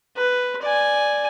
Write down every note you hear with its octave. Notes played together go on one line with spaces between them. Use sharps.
B4
D5 G#5